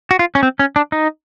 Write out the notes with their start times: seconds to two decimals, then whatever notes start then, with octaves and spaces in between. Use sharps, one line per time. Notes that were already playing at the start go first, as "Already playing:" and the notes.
0.11 F#4
0.19 F4
0.35 C#4
0.43 C4
0.59 C#4
0.76 D4
0.92 D#4